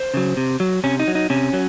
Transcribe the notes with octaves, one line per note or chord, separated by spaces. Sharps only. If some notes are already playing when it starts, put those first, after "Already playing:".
Already playing: C5
C#3 F#3
C3
F#3
C3 C#4
D#4
F#3
D#4
C3 C#4
F#3